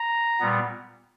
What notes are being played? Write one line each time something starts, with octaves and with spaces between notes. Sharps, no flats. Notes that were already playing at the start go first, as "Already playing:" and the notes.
Already playing: A#5
A#2 G3 B3